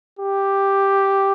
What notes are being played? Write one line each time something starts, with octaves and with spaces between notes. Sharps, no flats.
G4